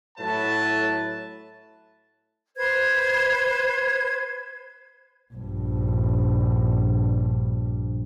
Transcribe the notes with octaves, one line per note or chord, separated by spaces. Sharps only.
A2 F#3 A3 B4 E5 A5
B4 C5 G#6
A#1 G2